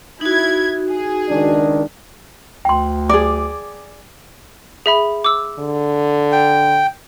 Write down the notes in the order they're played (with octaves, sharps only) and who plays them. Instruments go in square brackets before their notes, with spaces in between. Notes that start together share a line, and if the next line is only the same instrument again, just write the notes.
[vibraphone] D#4 F#4 [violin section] E4 G#6
[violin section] G#4
[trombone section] C#2 D#3 D4
[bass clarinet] D2 [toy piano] G5 C6
[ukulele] G#4 D5 [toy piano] D6
[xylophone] G#4 E5 B5
D6 E6
[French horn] D3
[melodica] G5